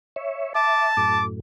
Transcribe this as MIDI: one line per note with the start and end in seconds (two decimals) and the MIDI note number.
0.16 0.53 73
0.16 0.53 76
0.55 0.95 76
0.55 1.20 81
0.55 0.89 86
0.97 1.40 42
0.97 1.40 45
0.97 1.25 86